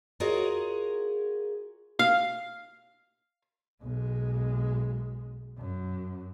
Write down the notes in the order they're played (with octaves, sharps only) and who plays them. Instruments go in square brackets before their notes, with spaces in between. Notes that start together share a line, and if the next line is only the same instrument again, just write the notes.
[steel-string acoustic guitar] F4 F#4 G#4 A#4 C#5 D#5
[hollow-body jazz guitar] F5
[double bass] B1 G#3
F#2